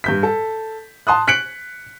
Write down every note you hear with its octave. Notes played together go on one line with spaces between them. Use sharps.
G2 G6 B6
A4
A5 C6 D#6 F#6
F#6 B6 C#7 D7 F#7